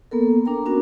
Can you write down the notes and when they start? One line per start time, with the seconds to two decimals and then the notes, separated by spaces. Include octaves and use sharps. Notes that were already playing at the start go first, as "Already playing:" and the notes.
0.11 A#3 B3 A4 A#4
0.46 D4 A#4 G5 A#5
0.65 B3 C#4 D4 F#4 A#4